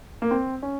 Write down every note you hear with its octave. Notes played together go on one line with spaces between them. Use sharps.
A#3
C4
C#4